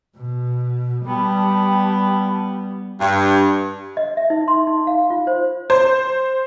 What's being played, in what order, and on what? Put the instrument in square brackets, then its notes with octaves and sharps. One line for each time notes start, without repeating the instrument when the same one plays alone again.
[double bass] B2
[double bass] G3 [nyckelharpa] B3 [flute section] G5 A5 B5
[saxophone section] G2
[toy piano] D#5
E5
D#4
C6
D#4
F5
F4
C5
[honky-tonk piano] C5